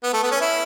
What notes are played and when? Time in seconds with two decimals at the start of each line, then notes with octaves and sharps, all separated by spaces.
0.03 B3
0.13 A3
0.23 B3
0.31 C#4
0.41 E4